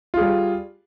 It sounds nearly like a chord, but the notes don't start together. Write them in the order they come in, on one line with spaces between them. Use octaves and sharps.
F4 G#4 G3